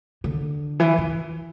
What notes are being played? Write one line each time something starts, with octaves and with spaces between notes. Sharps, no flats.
D3
E3
E3